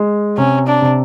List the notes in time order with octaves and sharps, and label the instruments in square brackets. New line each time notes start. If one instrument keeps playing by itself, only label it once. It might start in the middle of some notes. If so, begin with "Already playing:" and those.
Already playing: [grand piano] G#3
[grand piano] C3 [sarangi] C#4
[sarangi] D4
[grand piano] C3